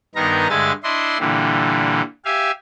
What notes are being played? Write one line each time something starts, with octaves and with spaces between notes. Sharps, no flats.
G2 D#3 B3 D#4 A#4 A#5
G2 D3 G#3 E5 G#5 A6
D4 E4 D#5 C6
A#2 D3 E3 G3
G4 E5 F5 G#5